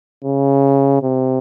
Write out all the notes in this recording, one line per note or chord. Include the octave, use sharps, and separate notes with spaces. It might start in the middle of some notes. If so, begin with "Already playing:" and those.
C#3
C3